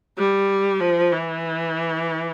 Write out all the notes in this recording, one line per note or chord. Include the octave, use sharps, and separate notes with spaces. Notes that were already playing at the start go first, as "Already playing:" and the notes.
G3
F3
E3